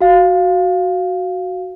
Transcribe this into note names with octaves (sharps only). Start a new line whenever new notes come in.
F#4 F5